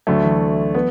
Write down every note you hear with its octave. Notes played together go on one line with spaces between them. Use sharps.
D2 D3 F#3 A3
E3
B3